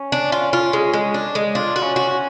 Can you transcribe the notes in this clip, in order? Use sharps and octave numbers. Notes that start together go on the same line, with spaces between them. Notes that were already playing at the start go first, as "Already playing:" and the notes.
Already playing: C#4
D4
F4
F4
G#3
G#3
D4
G#3
D4 F4
F#4
C#4
F#4
C#4